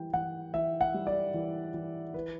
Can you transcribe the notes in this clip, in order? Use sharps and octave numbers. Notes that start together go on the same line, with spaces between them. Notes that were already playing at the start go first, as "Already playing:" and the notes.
Already playing: E3 G3 G5
E3 F#5
E3 E5
F#5
G3
D5
E3
E3
E3 B4